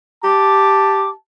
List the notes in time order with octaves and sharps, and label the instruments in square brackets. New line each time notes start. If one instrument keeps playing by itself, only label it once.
[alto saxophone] G4 [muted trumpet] A5 [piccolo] D6